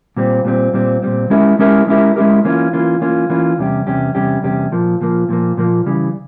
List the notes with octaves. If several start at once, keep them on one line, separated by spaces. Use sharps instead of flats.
A#2 G3 C4
A#2 G3 C4
A#2 G3 C4
A#2 G3 C4
G#3 C#4 E4 G4 A#4
G#3 C#4 E4 G4 A#4
G#3 C#4 E4 G4 A#4
G#3 C#4 E4 G4 A#4
E3 A#3 C#4 F4
E3 A#3 C#4 F4
E3 A#3 C#4 F4
E3 A#3 C#4 F4
E2 C3 G3 C#4 G4
E2 C3 G3 C#4 G4
E2 C3 G3 C#4 G4
E2 C3 G3 C#4 G4
A#2 F3 A#3
A#2 F3 A#3
A#2 F3 A#3
A#2 F3 A#3
C#3 E3 G3